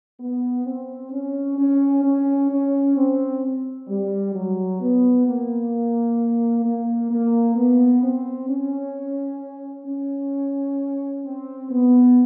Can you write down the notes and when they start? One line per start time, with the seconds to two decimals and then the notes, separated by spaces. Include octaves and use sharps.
0.19 B3
0.65 C4
1.11 C#4
1.58 C#4
2.03 C#4
2.50 C#4
2.96 C4
3.88 G3
4.34 F#3
4.80 B3
5.26 A#3
6.64 A#3
7.10 A#3
7.56 B3
8.03 C4
8.48 C#4
9.86 C#4
11.25 C4
11.70 B3